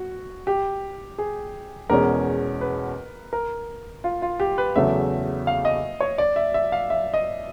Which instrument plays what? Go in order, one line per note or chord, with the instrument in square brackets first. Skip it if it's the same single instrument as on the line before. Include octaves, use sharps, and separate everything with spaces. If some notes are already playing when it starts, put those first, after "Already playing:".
Already playing: [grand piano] F#4
G4
G#4
[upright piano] E2 B2 G#3 C#4 [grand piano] A#4
[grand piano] B4
A#4
F4
F4
G4
B4
[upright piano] E2 C#3 F#3 A3 [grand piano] E5
[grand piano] F5
D#5
C#5
D5
E5
E5
F5
E5
D#5